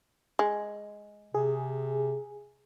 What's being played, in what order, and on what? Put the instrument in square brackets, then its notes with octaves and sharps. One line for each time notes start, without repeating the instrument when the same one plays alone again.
[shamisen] G#3
[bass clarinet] C3 [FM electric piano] G#4